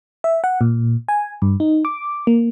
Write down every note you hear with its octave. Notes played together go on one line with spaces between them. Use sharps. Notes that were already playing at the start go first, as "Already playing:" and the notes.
E5
F#5
A#2
G#5
G2
D#4
D6
A#3